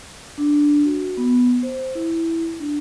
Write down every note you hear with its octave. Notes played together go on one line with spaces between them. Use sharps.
D4
F#4
B3
C5
E4
D4